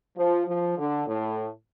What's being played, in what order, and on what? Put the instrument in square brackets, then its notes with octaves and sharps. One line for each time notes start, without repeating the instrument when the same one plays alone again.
[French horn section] F3
F3
D3
A2